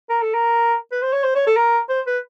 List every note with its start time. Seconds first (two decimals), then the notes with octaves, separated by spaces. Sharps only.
0.09 A#4
0.22 A4
0.34 A#4
0.92 B4
1.02 C5
1.13 C#5
1.24 C5
1.35 C#5
1.47 A4
1.57 A#4
1.89 C5
2.07 B4